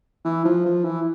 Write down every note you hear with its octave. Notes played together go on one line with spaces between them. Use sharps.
E3
F3
F3
E3